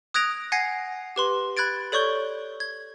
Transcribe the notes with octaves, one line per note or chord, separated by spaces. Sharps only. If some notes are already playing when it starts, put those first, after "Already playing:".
D#6 F#6 G#6 A#6 D7 F7
F#5 G#5 G#6 A#6 C7
G4 B4 C6
B5 F#6 G#6 A6 D7
A4 C#5 D5 C#6 G6 G7
G#6